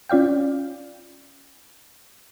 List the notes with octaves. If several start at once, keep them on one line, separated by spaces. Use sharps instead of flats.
C#4 F4 D5 F5 G5